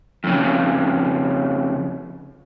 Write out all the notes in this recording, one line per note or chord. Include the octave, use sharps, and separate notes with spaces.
F2 C#3